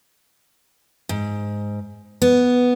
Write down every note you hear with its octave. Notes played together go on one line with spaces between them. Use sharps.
G#2
B3